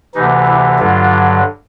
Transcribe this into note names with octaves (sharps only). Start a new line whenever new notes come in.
D2 C3 E3 D#4
E4
G2 D3 F#3 F4